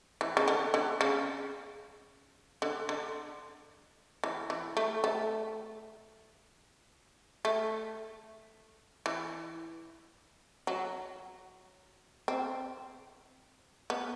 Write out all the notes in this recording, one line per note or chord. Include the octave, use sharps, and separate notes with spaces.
E3
C#3
D3
D3
C#3
D3
D3
E3
E3
A3
A3
A3
E3
F#3
C4
B3